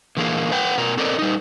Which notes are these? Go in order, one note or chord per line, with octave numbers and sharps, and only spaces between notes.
D3 E3 A#3 G#4 A#4
B4 F#5 G5
B2 A#4
C4 A4 A#4 D5 D#5
G3 D#4